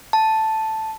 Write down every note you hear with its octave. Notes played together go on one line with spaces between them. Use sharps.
A5